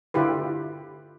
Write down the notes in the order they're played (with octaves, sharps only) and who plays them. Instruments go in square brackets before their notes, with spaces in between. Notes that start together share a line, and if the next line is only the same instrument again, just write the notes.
[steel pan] D3 E4 F4 G4 B4